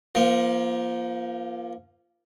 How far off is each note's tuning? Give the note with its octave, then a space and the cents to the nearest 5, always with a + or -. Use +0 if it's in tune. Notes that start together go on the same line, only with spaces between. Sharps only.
F3 -15 A#3 +25